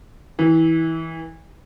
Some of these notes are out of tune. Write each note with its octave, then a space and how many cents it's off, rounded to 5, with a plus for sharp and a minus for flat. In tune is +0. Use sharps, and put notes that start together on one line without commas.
E3 -25